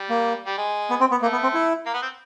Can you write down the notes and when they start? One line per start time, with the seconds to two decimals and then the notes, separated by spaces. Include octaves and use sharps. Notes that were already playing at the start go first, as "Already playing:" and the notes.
Already playing: G3
0.09 A#3
0.46 G3
0.58 G#3
0.90 B3
1.00 C4
1.11 B3
1.21 A3 A#3
1.32 B3
1.43 C4
1.54 E4
1.86 A#3
1.94 B3
2.02 C4